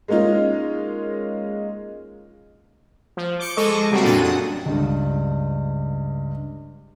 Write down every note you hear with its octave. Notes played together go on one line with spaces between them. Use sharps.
G#3 A#3 C#4 D#4 F4
F3
D6 G6 C#7 D7
G#3 A4 D#5 C#6 D6
C#3 G3 A#3 C4 F#4
F2 A#2 F#3 D4 A4 D#7
F#2 F#5 D#6
C#2 G2